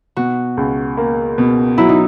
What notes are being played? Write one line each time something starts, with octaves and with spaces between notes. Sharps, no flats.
B2 F#4
C#2
A#3
B2
F#3 E4
D#4